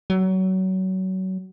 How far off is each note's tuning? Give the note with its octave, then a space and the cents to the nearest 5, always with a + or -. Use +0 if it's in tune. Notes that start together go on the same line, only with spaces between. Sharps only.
F#3 +25